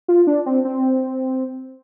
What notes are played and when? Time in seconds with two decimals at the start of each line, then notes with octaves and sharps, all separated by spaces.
0.08 F4
0.27 D4
0.46 C4
0.65 C4